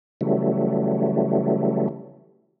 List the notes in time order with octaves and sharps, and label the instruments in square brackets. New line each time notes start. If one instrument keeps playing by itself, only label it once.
[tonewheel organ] C#3 E3 F#3 G3 A3